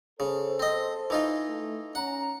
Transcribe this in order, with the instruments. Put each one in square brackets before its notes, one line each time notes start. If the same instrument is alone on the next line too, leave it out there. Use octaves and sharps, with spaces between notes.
[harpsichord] C#3 [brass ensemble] A4 C5
[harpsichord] C4 D#5
E3 D#4 F4
[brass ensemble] A3
[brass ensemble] C#4 A#5 [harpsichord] F#5